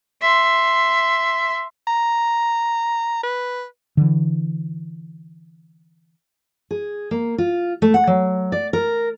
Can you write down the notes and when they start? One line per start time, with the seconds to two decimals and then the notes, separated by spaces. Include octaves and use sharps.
0.22 E5 C6
1.87 A#5
3.23 B4
3.97 D3 E3
6.71 G#4
7.11 A#3
7.38 F4
7.82 A3
7.94 F#5
8.07 F#3
8.52 D5
8.73 A#4